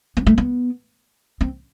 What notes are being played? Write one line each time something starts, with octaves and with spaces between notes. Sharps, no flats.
B3
A3
B3
C4